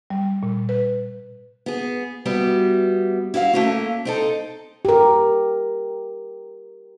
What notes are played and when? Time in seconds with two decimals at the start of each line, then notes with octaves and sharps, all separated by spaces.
0.10 G3
0.43 A#2
0.69 B4
1.66 B3 G#4
2.25 G3 B3 F#4 E5
3.34 E4 F#4 D#5 F5
3.54 A3 A#3 C#4
4.05 C4 D#4 A4
4.85 G4 A#4